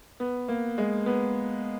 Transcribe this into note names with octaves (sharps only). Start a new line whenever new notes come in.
B3
A#3
G#3
B3